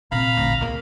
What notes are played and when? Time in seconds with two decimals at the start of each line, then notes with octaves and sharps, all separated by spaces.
0.12 A#2 C4 F5 A#5 B5
0.37 A1 D2
0.61 C#2 A#3